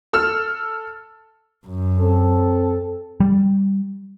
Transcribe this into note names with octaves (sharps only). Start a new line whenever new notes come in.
A4 E6 F6
F#2
C4 A4
G3